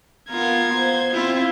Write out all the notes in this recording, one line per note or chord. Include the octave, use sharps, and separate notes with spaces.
B3 F4 A#4 G#6
C5
C4 E4 F4